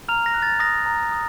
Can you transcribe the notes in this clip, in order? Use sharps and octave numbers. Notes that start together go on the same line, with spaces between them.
A#5 F6 F7
A#6
F#6
A6
D#6 A#6
A#5
D#6